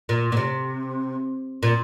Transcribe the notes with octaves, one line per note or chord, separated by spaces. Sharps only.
A#2
A#2
C3
A#2